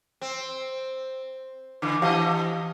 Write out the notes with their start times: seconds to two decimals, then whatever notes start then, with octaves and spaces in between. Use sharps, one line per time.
0.21 C4
1.82 D3 E3
2.02 E3 G4 D#5 F5 A5